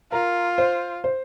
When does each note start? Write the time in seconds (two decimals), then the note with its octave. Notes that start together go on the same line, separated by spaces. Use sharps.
0.12 F4 A#4
0.58 C5
1.04 C5